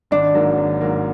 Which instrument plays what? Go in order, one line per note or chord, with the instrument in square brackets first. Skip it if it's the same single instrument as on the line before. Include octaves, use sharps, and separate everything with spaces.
[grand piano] G#1 [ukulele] D4
[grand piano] G#2 F#3 A#3
G#1
G#2 F#3 A#3